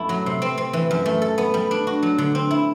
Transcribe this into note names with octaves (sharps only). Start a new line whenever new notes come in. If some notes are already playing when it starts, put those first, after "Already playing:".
Already playing: F#2 A3 E4
F#3
C3
C4
C4
E3
F#2
A3
A4
B3
G3
D4
F#4
F#3
D3
C4
E4